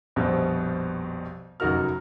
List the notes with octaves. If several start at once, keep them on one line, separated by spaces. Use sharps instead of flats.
A#1 F2 B2 G3
F1 F#2 D#4 F#4 A#4 F6